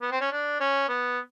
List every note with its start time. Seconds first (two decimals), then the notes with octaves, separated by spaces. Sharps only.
0.02 B3
0.12 C4
0.21 C#4
0.32 D4
0.60 C#4
0.89 B3